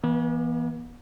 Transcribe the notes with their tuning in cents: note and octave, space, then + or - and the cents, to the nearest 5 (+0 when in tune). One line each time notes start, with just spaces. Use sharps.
E3 +0 B3 -40